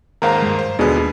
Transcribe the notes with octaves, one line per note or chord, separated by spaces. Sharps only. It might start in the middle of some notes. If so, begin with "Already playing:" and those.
D#2 G#2 A#4 C5 F5 A#5
G2 G#3
C5
D#2 B2 D3 G#3 D4
A#2